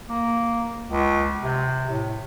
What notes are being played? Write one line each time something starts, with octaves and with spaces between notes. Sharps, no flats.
A#3
C#2
C3
A2